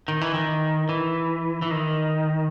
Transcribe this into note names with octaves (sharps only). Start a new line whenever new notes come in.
D#3
E3
D#3
E3
E3
D#3